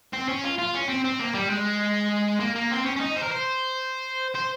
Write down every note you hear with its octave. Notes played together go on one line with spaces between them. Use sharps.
C4
C#4
F4
F4
C#4
C4
C4
A#3
G3
G#3
A#3
A#3
C4
C#4
C#4
D#4
C5
A#4
C5
C5